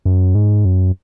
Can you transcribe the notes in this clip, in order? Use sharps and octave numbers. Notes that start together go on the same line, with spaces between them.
F#2
G#2
F#2